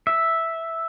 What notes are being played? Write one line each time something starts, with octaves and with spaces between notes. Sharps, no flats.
E5